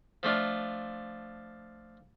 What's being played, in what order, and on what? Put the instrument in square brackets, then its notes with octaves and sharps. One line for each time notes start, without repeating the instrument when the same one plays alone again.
[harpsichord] F3 A3 D4 F4